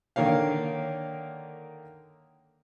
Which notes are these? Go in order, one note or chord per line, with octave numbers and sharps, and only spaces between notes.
D3 D#3 A#3 C#5 F5